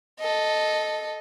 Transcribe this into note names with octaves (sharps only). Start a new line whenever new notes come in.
A4 D#5